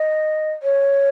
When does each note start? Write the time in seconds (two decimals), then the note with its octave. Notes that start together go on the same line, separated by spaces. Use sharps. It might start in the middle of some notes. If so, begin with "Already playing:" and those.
Already playing: D#5
0.63 C#5